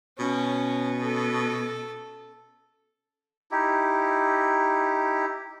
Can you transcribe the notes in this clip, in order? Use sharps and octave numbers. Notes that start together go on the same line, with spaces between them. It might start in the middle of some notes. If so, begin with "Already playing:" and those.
B2 C#4
A4
D#4 E4 G4